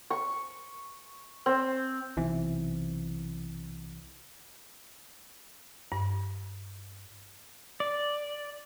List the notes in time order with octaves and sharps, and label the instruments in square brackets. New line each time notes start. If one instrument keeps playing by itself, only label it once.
[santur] C#6
C4
[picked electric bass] B1 C3 E3
[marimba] G2
[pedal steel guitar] D5